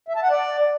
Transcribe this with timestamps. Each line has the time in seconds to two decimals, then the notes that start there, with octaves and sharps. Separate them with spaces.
0.08 E5
0.16 A5
0.23 F#5
0.30 D5